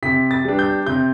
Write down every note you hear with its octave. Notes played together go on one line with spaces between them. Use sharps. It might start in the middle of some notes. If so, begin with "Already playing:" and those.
C3 B6
A6
G3 B3 D4
G6
C3 G6